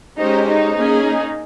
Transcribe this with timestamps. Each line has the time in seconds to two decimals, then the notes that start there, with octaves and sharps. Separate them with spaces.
0.18 G#3 C#4 D#4 G4 C5
0.47 D#4
0.75 A#3 C#4 G#4
1.04 D#4